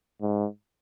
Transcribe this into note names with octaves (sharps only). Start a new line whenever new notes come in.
G#2